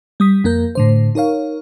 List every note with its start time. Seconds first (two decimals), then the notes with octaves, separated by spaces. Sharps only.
0.20 G3 D#6 B6
0.44 F2 A#3 A#4 G6
0.75 A2 D3 C5
1.15 D#4 A#4 C#5 F5